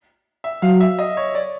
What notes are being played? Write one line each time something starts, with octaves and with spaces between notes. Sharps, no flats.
E5
F#3 F5
E5
D#5
C#5
D5